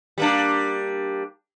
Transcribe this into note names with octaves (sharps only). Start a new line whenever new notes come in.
G3 A#3 D4